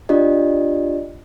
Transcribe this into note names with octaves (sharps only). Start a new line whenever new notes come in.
D4 F4 G4 D5 D#5